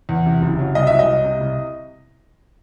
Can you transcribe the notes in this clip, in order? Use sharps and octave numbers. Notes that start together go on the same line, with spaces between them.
E2
C3
F#1
F#3
C2 D#5
F#3 E5
D#5
C2
C3
C2